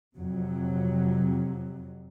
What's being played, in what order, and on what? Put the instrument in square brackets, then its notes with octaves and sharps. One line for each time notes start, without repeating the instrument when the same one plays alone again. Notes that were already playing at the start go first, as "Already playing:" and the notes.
[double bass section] F2 C3 F#3